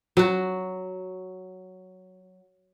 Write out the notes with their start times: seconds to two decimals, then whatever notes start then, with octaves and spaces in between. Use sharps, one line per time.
0.17 F#3 F#4